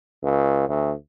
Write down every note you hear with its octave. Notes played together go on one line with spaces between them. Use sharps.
C#2
D2